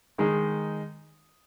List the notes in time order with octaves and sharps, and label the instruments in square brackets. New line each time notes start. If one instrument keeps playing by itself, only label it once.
[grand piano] D#3 G#3 D#4